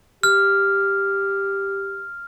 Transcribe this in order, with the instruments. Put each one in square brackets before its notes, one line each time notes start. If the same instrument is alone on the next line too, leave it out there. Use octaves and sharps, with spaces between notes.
[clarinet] G4 [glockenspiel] F6